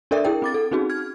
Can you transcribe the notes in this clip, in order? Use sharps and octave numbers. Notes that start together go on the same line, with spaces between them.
D4 A4 A#4 D5 E5
E4 G#4 A#4 G5
C4 D6 A6
A4
C4 C#4 D#4 F#4 G#4
F6 G#6